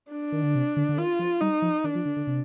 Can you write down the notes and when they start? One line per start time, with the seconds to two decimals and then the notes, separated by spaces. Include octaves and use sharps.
0.12 D4
0.32 D#3
0.43 D3
0.55 C3
0.77 D3
0.89 D3
0.98 D#3 F4
1.19 F3
1.41 G3 D#4
1.62 F3
1.84 D#3 D4
1.95 F3
2.06 D3
2.17 D3
2.27 C3